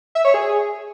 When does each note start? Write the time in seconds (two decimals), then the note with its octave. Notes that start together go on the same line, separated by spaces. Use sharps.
0.15 E5
0.25 C#5
0.34 G#4